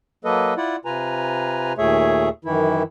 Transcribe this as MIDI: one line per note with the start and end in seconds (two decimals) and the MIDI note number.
0.25 0.54 54
0.25 0.54 58
0.25 0.54 69
0.25 0.54 71
0.25 0.54 75
0.57 0.76 64
0.57 0.76 65
0.57 0.76 74
0.57 0.76 78
0.85 1.73 48
0.85 1.73 65
0.85 1.73 71
0.85 1.73 80
0.85 1.73 82
1.78 2.29 39
1.78 2.29 46
1.78 2.29 57
1.78 2.29 68
1.78 2.29 73
1.78 2.29 76
2.45 2.83 42
2.45 2.83 51
2.45 2.83 52
2.45 2.83 64